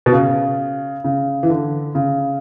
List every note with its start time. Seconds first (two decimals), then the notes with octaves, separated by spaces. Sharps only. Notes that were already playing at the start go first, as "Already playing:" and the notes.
0.06 B2
0.12 C#3
1.04 C#3
1.43 E3
1.50 D3
1.95 C#3